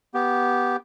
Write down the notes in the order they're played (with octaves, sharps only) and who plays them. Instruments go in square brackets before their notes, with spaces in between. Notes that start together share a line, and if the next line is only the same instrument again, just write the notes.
[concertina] B3 G4